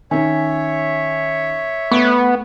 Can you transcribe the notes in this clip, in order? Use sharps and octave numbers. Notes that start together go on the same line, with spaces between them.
D#3 C#4 C#5 E5 G#5
A3 B3 C#6 D7